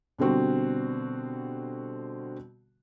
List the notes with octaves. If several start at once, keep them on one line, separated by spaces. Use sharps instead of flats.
B2 D3 G3 C4 F#4